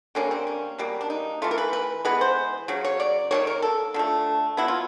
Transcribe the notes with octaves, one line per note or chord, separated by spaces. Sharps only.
D3 G3 A#3 C#4
C4
C#4
B2 G3 A#3
D4
D#4
E3 A3 F4
A#4
B4
B4
E3 G#3 B3 B4
C5
C#3 F#3
C#5
D5
D#3 G3 A#3 C#5
A#4
A4
D3 F3 A3
B2 F#3 B3 E4
F4